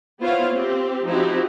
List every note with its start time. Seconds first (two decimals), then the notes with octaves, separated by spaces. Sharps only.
0.21 B3 E4 F4 C5 C#5 F5
0.54 C4 G4
1.09 F3 C4 D#4 E4 F#4 G4